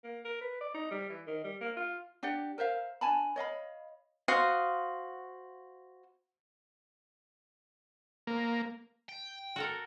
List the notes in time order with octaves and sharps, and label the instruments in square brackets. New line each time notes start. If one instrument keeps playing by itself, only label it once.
[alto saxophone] A#3
A#4
B4
D5
D#4
G3
E3
D#3
G3
A#3
F4
[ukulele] D4 G4 D5 F#5
A#4 C5 E5 F5
D4 G#5 A5 B5
C#5 D#5 F5 B5
[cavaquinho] F#4 C5 F5 D#6
[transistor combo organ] A#3
[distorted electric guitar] G5
[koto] F#4 A4 A#4